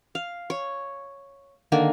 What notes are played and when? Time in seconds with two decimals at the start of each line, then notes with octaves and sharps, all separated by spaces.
0.15 F5
0.50 C#5
1.72 D3 D#3 A#3 G#5